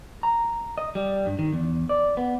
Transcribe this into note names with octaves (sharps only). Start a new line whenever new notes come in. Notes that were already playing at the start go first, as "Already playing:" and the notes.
A#5
D#5
G3
G2
D#3
E2
D5
B3